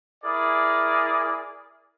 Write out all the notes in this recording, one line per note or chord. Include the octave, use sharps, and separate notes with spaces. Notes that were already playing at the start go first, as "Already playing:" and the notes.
E4 G#4 A#4 D5